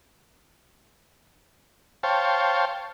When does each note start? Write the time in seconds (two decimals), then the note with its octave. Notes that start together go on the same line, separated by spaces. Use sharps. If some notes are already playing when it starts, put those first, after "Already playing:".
2.03 C5 C#5 F5 G5 A5